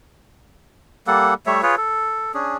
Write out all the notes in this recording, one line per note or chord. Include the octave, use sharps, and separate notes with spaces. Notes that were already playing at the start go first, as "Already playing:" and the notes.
G3 A#3 A4 F#5
G3 A3 C#5 E5
F4 G#4 B4 C#5
A4
C#4 D4 G#4